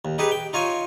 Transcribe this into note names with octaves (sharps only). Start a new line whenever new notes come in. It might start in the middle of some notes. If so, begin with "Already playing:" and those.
D#2
D#4 G4 G#4 B4
G5
D#4 F4 C#5 G#5